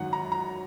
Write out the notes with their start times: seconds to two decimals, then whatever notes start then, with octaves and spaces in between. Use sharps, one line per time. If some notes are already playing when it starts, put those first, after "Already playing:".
Already playing: G#1 F#2 D#3 F#3 F#5
0.13 A#5
0.32 A#5